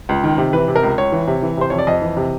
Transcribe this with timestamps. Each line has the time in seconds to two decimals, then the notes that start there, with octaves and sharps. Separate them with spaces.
0.09 C#2
0.23 D#3
0.38 C3
0.53 E3 B4
0.68 C3
0.76 A#4
0.83 C#2
0.98 C#2 C#5
1.12 E3
1.27 C3
1.42 E3
1.57 C3 C5
1.70 F2 C#5
1.78 D5
1.87 F2 D#5
2.02 E3
2.17 C3